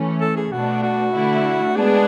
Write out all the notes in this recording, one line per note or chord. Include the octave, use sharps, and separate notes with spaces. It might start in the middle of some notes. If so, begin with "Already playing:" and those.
Already playing: E3 A3 C#4
A4
G#4
B2 A3 D4 F#4
F#4
D3 A3 E4
G#3 B3 D4 G#4